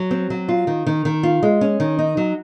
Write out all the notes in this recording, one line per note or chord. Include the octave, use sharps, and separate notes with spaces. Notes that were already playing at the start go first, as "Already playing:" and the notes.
Already playing: F#3
C4
F#3
F4
D#3
D#3
D#3
F4
G#3
C#4
D#3
D#4
F#3